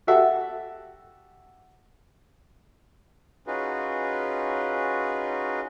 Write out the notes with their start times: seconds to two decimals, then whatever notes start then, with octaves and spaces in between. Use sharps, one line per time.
0.07 F#4 G4 A4 E5 F#5
3.47 C#4 D#4 F4 F#4 G#4 B4